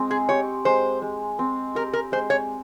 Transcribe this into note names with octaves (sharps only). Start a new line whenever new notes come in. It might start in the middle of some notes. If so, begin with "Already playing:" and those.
Already playing: G#3 C4
G#4
G4 C#5
G#3 C5
G#3
C4
G4 A#4
A#4
G#3 C5
C#5